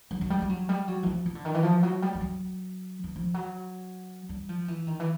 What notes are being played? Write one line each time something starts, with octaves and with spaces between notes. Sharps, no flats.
F#3
F#3
G3
G3
F#3
G3
F#3
E3
F3
F3
D3
D#3
E3
F3
F#3
G3
G3
F#3
E3
F3
F#3
G3
F3
E3
D#3
E3